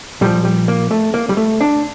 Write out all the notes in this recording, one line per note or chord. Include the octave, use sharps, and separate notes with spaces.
A#2 F3 G3
G3
A#3
A3
A#3
G3
A3
D4